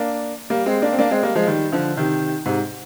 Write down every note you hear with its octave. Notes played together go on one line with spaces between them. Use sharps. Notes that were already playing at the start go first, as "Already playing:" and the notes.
Already playing: A#3 D4
G3 A#3
G#3 C4
A#3 D4
C4
A#3 D4
G#3 C4
G3 A#3
F3 G#3
D#3 G3
D3 F3
C3 D#3
G#2 C3